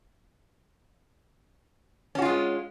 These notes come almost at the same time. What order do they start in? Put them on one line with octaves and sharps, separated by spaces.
C#4 F#4 F4 G#3